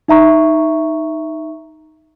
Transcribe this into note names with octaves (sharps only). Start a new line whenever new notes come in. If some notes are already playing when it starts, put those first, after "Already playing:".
D#4 E5 A#5 C#6